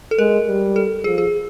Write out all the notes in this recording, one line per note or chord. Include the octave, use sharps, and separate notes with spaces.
A4
G#3 A#4
G3
A4
F3 G#4
G#4